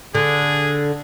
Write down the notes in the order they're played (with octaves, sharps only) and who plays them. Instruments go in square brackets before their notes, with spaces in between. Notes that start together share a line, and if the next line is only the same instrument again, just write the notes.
[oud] D3 [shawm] G#4